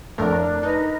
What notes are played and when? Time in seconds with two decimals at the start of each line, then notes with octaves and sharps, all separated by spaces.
0.18 F2 A2 D4 A#4
0.63 D#4 A#4 B4 D#5